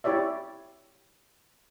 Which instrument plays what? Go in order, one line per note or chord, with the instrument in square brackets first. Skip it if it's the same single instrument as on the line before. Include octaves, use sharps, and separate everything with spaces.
[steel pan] E4 G4 C#5 D5 E5